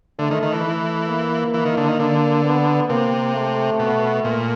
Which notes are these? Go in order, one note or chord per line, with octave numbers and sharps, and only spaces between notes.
D3 A3
D#3
D#3
E3
A3
A#3
E3
D#3
D3
D#3
D3
B3
C3 A#3
A3
B2
A#2